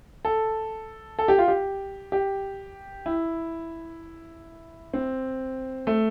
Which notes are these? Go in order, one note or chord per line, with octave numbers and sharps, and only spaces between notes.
A4
A4
G4
F4
G4
G4
E4
C4
A3